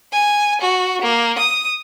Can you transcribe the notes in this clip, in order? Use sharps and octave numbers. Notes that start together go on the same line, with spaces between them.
G#5
F#4
A#3
D#6